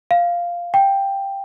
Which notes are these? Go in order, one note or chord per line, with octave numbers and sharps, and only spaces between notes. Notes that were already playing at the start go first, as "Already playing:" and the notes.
F5
G5